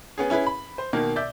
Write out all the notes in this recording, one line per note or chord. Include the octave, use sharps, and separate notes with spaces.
B3 C#4 G#4
C#4 E4 G#4 B4
B5
C5
B2 D#3 A#3
D5 E5 G6